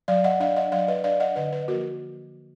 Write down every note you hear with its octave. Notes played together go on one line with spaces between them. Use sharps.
F#3 D5 F5
D#5 F#5
D4 D5 F5
D#5 F#5
F#3 D5 F5
B4 D#5
D4 D5 F5
D#5 F#5
D3 B4 D#5
B4 D#5
F3 A#3 F#4 A#4